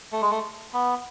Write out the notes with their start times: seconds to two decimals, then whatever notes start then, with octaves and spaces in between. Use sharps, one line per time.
0.12 A3
0.22 G#3
0.31 A3
0.73 B3